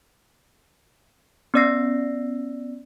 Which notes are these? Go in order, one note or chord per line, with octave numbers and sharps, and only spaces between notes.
B3 C#4 D5 E6 A#6 C7